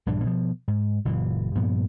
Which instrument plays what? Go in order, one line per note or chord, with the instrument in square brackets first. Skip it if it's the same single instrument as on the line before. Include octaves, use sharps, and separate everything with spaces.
[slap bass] A#1 G2 E3 D4
B2 F3
G#2
F#1 A#2 E3
G2 A#2 F3 B3